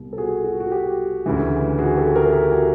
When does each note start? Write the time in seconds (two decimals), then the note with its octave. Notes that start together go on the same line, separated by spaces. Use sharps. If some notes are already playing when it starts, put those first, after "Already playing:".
Already playing: C2 B2 G3
0.13 A4
0.18 F#4 G#4
0.44 F#4
0.60 F#4
0.72 G4
1.26 D2 C#3 E3
1.79 F#4 G#4
1.97 G4 A4
2.15 G#4 A#4
2.33 G4
2.51 F#4 G#4